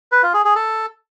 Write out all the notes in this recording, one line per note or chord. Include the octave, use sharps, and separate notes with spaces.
B4
F4
G#4
G#4
A4